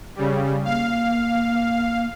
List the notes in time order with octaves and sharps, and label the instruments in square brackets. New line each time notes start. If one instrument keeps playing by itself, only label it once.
[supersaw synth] C#3 G3
[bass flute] A#3 [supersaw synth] F5